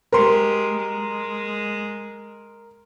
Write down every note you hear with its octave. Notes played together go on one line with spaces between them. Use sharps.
G#3 G4 A#4 C6
G#3